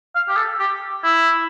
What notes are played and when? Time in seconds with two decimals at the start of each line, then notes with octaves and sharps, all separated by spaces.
0.15 F5
0.29 G4
0.36 A4
0.59 G4
1.03 E4